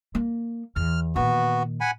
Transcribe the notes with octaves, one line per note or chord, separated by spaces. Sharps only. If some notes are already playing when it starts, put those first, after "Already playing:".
A#3
E2 F6
A#2 D#3 B3 F#4
F#5 G#5 B5